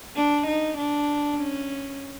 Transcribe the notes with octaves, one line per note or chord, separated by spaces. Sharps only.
D4
D#4
D4
C#4